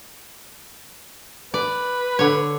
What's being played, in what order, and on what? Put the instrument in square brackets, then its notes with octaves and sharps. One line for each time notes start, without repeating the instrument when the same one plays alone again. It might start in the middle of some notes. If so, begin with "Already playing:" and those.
[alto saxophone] B4 [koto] D5
[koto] D3 C#5